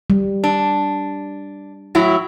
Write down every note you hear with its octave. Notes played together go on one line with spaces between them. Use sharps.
G3
D4
A2 F#3 E4